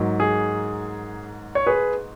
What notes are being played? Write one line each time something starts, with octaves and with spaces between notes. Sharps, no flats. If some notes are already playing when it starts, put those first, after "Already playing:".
Already playing: G#2 F#3 A#3
G#4
C#5
G#4 B4